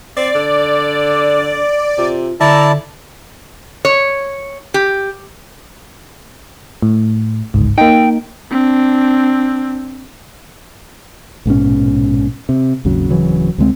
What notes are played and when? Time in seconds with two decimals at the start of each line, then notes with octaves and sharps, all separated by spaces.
0.17 C4 D5
0.35 D3 D6
1.97 C3 F4
2.40 D3 E4 D5 E5 A5 A#5
3.85 C#5
4.74 G4
6.82 A2
7.54 G1 C#2 G#2
7.78 A#3 D#4 G5
8.51 C4 D4
11.46 A#1 G#2 B2 C#4
12.49 C3
12.85 G#1 D#2 C#3 F#3
13.10 D1 C#3 E3 F#3
13.58 D2 C3 G#3 C4